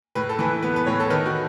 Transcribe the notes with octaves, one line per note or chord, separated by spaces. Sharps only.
A2 B4
A4
E3 B4
B3 B4
B4
A2 C#5
A4
D#3 B4
F#4